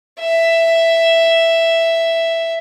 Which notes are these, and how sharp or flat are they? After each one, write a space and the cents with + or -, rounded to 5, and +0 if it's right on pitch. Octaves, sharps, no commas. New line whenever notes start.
E5 +5